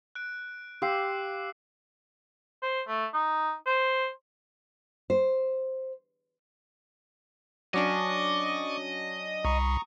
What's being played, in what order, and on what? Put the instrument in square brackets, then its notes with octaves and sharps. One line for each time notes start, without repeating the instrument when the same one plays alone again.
[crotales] F#6 D7
[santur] G4 F5 C6 [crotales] D6 E6 C7
[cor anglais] C5
A3
D#4
C5
[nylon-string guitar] C5
[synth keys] F#3 C#4 D4 [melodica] D5 C#6 D6 [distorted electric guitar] D#5
[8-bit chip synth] C2 [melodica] A#5 C#6 D#6